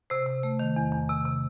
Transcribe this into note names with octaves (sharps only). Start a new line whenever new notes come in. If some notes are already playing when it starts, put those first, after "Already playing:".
C3 C5
C3
A3
D#3
E2
E2
C3
C3